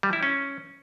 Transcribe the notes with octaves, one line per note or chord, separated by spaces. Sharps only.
G3
E4
C#4